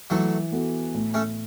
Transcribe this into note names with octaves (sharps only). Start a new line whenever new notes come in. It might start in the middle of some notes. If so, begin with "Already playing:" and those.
E3 F#3 A3
B3 F#4 A4
A2
A3 C#4